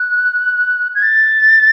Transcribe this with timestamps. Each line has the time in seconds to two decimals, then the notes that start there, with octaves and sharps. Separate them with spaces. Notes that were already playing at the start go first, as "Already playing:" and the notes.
Already playing: F#6
0.95 G#6
1.02 A6